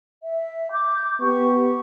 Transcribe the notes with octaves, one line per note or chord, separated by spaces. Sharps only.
E5
D6 G6
B3 G4 C#6